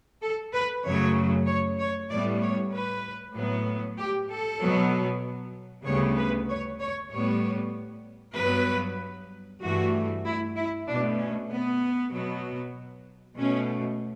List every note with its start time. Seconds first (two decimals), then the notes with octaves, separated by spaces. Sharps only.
0.22 A4
0.53 B4
0.84 F#2 C#3 F#3 A3 C#5
1.47 C#5
1.79 C#5
2.10 A2 G3 B3 D5
2.42 C#5
2.73 B4
3.35 A2 F#3 B3
3.98 G4
4.30 A4
4.61 B2 F#3 B3
5.86 D2 C#3 G3 B3 C#5
6.17 B4
6.49 C#5
6.80 C#5
7.11 A2 G3 B3 C#5
8.37 G2 F#3 B3 B4
9.62 G2 E3 A3 F#4
10.25 E4
10.57 E4
10.88 B2 A3 D4
11.19 C#4
11.50 B3
12.13 B2 F#3 B3
13.38 B2 A3 C#4